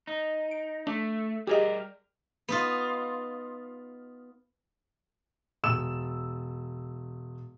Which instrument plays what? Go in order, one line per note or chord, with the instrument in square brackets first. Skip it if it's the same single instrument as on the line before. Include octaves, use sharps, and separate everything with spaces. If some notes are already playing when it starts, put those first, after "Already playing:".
[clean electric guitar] D#4
[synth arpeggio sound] D7
[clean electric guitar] A3 [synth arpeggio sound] D4
[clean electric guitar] G3 A#4 [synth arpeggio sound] G4 G#4 D#5
[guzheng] B3 D#4 F4
[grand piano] E1 E6 E7